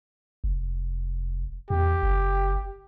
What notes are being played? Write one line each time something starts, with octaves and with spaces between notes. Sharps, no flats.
F1
E2 G4
F#1